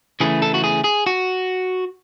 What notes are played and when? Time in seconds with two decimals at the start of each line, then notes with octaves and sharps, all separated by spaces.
0.20 C#3 E3 A3 G#4
0.42 A4
0.54 F#4
0.64 G#4
0.84 G#4
1.07 F#4